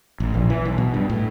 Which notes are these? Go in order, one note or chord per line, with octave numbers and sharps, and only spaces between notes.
A1
A#1
E3
B1
B2
G2
A2